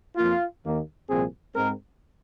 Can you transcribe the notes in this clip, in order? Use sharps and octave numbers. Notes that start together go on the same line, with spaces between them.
F2 F3 A#3 F4
D#2 D#3 A#3
C2 A#2 F3 C4 G#4
G#2 G#3 C4 A#4